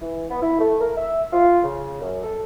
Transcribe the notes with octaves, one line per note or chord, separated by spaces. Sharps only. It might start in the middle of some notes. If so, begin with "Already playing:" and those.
E3
B3
E4
A3
A#4
E5
F4
C#3
F#2
A4